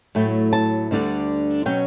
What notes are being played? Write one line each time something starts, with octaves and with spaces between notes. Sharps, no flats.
A2 F#3 A3 E4 G5
A5
D2 D3 G3 D4
B2 F#3 C#4 G5